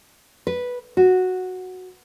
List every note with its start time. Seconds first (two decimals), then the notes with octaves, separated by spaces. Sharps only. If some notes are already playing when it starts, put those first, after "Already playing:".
0.47 B4
0.97 F#4